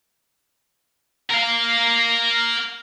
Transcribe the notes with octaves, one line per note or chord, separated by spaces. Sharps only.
A#4 F5